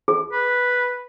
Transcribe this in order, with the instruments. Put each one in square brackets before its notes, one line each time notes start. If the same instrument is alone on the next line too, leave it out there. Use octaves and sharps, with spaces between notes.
[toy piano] G#4
[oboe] B4